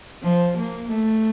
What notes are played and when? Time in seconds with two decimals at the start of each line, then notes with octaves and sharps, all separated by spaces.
0.22 F3
0.57 A#3
0.91 A3